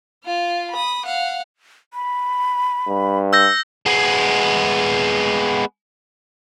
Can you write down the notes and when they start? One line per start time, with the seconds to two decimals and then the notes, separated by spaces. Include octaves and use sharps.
0.24 F4 F5
0.71 B5 D#6
1.05 F5 F#5
1.94 B5
2.87 G2
3.33 E6 G6 A#6
3.86 G#3 B3